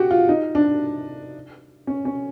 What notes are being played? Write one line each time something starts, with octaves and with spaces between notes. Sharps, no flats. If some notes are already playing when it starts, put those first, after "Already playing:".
Already playing: F#4 G4
F4
D#4
D4
C#4
C#4